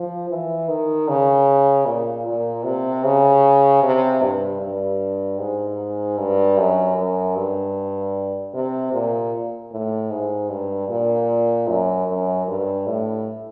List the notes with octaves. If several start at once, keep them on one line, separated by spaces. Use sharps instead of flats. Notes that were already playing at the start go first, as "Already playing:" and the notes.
Already playing: F3
E3
D#3
C#3
A#2
A#2
C3
C#3
C3
G2
G2
G#2
G2
F#2
F#2
G2
C3
A#2
A2
G#2
G2
A#2
F#2
F#2
G2
A2